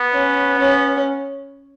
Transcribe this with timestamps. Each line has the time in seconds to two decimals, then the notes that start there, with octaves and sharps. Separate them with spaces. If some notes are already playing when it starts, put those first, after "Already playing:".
Already playing: B3
0.13 C#4
0.59 C#4